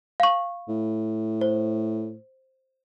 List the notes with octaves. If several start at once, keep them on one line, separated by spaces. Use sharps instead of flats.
F5 C#6
A2
C5